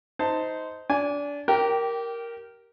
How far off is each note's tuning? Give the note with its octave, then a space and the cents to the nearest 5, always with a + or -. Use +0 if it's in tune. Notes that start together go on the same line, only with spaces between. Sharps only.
D#4 +20 C5 -15 A5 +15
D4 -25 G#5 +0
G4 -20 A#4 +0 G5 +0